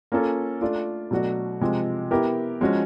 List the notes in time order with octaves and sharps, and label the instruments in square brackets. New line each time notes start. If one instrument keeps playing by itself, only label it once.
[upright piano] A#3 C#4 F4 A4
A3 D4 F4
B2 F#3 A3 D4 F#4
C3 F3 G#3
B3 E4 G4 A#4
F3 G#3 C#4 F#4